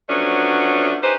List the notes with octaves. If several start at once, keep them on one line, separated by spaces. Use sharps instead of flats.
F3 F#3 A3 B3 C#4 D4
C#4 D#4 G4 B4 C5